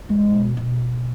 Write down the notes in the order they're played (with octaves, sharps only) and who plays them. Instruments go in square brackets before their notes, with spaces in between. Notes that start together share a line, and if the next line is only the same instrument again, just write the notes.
[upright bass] E2 [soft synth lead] G#3
[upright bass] B2
B2